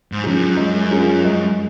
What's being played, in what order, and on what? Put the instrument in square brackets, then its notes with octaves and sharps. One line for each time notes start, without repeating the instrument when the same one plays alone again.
[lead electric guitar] G#2
[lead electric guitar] F2 [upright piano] C#4 F4 G#4
[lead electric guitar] F#2
[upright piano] G#3
C#4 F4 G#4
G#3